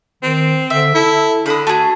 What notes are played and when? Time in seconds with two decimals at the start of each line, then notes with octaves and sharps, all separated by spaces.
0.23 D#3 C4
0.70 D3 E5
0.95 E4 A4
1.46 D3 B5 D#6
1.67 A3 F#4 G#4